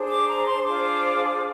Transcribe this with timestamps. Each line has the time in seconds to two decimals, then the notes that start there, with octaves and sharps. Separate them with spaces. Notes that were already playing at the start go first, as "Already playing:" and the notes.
Already playing: D4 G#4 C5
0.08 D6
0.27 A#5
0.45 C6
0.64 D4 F4 G#4 C5 D6